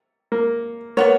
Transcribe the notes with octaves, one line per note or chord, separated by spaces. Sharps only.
A#3
A#3 B3 F#4 C#5